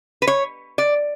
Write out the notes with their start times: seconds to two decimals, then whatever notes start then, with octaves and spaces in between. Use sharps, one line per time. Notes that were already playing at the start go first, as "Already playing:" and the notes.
0.22 B4
0.27 C#5
0.78 D5